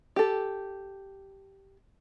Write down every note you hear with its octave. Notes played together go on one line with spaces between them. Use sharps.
G4 A4